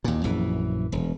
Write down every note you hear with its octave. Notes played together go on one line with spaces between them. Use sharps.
D#2 A#2
A#1 F#2 E3
E1